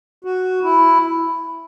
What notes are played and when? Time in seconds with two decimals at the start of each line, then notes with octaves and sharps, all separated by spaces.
0.24 F#4
0.63 E4